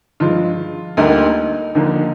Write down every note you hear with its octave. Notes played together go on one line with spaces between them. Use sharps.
G2 F3 G#3 F4
D2 D3 G3 A#3 D#4
D#2 D3 F3 A#3